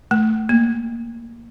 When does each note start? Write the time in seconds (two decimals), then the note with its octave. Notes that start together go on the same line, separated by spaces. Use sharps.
0.11 A3
0.49 A#3